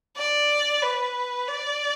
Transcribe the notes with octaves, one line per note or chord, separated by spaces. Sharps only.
D5
B4
D5